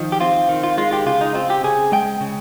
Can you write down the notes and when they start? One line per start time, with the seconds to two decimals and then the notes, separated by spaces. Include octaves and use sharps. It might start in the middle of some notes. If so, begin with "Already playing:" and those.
Already playing: D#3 F3
0.12 G4
0.20 C4 F4
0.49 D#3
0.64 F4
0.78 G#3 F4
0.93 G4
1.06 C#3 F4
1.21 D#4
1.35 C4 F4
1.50 G4
1.64 C#3 G#4
1.92 G#3 G5
2.21 C#3